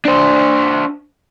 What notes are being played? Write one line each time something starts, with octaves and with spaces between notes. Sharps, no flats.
D4 C5